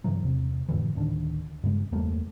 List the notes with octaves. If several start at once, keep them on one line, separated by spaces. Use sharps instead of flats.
G2 C#3 E3 F#3
E2 C3
F2 A2 D3 E3
D2 A2 D#3 D4
G2 C#3 G#3
E2 G3 A3 A#3